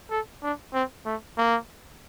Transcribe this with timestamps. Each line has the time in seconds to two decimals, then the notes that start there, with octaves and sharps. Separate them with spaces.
0.10 A4
0.43 D4
0.74 C4
1.06 A3
1.38 A#3